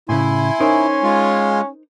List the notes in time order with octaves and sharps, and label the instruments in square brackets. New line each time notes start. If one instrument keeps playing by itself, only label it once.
[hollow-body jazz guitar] A2 C#3 [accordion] E4 [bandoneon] G#5 C6
[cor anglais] C#4 [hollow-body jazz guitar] D#4 A#4 C5
[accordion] G#3 F4